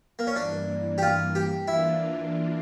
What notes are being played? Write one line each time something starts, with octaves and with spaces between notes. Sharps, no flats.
A#3
C#4
G2 E3 A#3 D4
G4
F4
G4
E3 A#3 D4 E4 F4